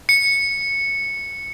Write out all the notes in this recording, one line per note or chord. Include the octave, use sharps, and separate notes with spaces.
C#7